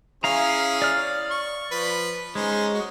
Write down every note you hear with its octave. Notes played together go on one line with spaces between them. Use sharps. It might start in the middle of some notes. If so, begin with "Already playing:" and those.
C#4 E4 G#4 F5 A#5
D5 F6
C#6
F3 B4
G#3 C#4 D#4 C5
F#4